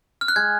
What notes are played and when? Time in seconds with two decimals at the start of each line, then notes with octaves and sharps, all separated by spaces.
0.21 F6
0.28 F#6
0.36 G#3 G#6